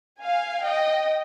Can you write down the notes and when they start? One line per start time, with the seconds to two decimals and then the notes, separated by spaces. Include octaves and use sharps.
0.20 F5 G#5
0.64 D#5 G5